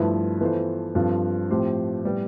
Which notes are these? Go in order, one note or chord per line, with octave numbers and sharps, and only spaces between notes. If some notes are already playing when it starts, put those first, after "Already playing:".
Already playing: G2 F3 A3 E4 B4
E3 B3 F4 A4 C5
G2 F3 C4 F4 A4
A2 F3 C4 G4 C5
A2 G3 B3